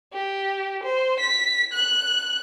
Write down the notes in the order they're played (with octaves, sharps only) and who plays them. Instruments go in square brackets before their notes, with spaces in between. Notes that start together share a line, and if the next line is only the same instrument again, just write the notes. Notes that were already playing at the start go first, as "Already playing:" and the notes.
[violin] G4
C5
B6
F#6